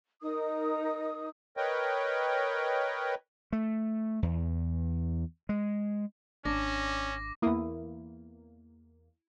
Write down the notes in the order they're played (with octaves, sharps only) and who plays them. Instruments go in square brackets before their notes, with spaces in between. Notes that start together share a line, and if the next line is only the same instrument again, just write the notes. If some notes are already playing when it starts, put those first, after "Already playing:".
[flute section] D#4 A#4 D#6
[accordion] A#4 B4 C#5 D#5 G5
[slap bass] A3
E2
G#3
[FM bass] G#1 [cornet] C#4 [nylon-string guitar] D4 [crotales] D6 A#6
[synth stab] E2 A#3 [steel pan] E4 D#6